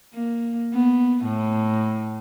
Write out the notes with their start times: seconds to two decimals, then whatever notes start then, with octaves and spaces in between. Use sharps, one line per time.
0.14 A#3
0.73 B3
1.25 A2